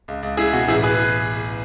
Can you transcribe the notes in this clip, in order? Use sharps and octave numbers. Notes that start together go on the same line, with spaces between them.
C#2
C#2
C#2 E4 G#4
B2 F#4
A1 E4 G#4
G#4 B4